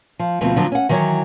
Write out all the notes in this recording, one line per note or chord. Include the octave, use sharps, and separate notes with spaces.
F3
D2 B2 F3 A3 C4
D3 F3 F#3
C#4 F#5
D#3 E3 F#3 C#5